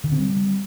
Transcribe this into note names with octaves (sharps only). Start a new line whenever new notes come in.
D3
C4
G3